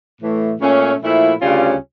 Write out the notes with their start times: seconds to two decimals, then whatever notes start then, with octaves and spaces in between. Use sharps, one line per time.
0.20 A2 E3 A3
0.60 A#2 A3 C#4
1.01 A#2 F3 A3 E4
1.41 D2 C#3 G3 C#4 F4